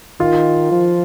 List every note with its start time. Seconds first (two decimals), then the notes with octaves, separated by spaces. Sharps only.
0.20 D#3 F4
0.72 F3